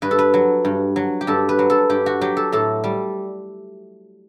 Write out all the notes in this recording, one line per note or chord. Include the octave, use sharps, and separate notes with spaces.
G2 B4
A4
B4
F#3
G2
F#3
G4
G2 A4
B4
F#3
A4
G2 G4
F#4
F#3 G4
A4
A2 A4
G3